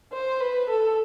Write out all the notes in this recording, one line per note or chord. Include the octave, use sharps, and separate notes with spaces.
C5
B4
A4